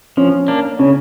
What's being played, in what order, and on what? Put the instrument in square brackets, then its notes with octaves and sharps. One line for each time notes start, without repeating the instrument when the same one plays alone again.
[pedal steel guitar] F3 [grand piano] C#4
[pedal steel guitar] A#3 D4
[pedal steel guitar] C#3 [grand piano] C#4